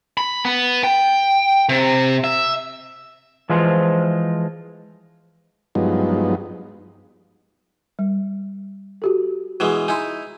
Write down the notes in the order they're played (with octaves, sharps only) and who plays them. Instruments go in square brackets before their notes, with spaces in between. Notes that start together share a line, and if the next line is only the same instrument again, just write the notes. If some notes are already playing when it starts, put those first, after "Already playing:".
[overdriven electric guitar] B5
B3
G5
C3
E5
[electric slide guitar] E3 F3 G#3 F4 C5
[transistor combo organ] G2 F3 F#3 G#3 B3 D#4
[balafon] G3
F#4 G4 A4
[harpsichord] B2 E3 G#3
[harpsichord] D#4 E4 [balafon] G#5 C6